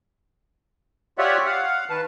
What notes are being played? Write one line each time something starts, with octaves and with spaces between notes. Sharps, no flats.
F4 G4 C#5 D5 E5 F#5
F5 F#5
D#3 B4 A5